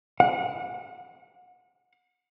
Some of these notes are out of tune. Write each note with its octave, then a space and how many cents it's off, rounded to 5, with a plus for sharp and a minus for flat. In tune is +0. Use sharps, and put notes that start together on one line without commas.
F#5 -30